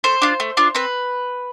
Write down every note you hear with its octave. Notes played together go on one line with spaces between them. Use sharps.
A3 C5
D4 F4
A3
D4 F4
C4 B4